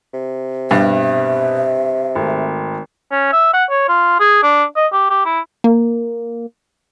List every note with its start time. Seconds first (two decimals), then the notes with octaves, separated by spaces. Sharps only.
0.13 C3
0.71 G2 B2 E5
2.15 G#1 A3
3.11 C#4
3.32 E5
3.53 F#5
3.70 C#5
3.88 F4
4.20 G#4
4.43 D4
4.76 D#5
4.92 G4
5.10 G4
5.25 E4
5.64 A#3